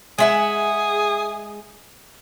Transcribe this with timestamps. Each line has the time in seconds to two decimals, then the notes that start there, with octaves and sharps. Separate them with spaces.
0.18 G#3 G#4 E5 F#5